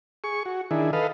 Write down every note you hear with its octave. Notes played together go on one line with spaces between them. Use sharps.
G#4 C#6
F#4
D#3 D4 E4 G#4
A4 B4 D#5 F5